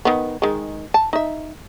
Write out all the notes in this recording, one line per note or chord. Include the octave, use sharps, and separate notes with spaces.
D#3 B3
D#3 G#3
A5
D#4 E5